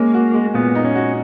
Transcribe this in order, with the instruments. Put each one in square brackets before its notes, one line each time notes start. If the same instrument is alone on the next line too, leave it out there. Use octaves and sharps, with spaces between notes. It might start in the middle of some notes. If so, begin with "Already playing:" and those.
Already playing: [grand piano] G#3 C#4 [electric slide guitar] A#3
[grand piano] F#4
G#3
[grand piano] A#2 [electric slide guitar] B3
[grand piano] D#4
[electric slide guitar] C#4
[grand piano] F#4